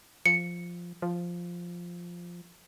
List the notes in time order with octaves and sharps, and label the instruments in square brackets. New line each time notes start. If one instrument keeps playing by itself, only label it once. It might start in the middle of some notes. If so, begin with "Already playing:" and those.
[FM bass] F3 [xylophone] C#7
[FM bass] F3